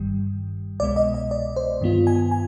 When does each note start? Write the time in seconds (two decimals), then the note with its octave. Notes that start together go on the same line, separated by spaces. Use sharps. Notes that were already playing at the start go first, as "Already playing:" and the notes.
Already playing: G1 G2 D#3 G3
0.80 C2 B2 G#3 B3 D5
0.96 D#5
1.14 D#5
1.31 D5
1.56 C5
1.81 G2 D#3 B3 F4
2.07 G#5
2.31 G#5